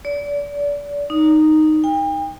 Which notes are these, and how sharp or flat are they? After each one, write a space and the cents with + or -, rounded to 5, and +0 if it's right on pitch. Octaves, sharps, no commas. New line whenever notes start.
D5 -30
D#4 -5
G5 +40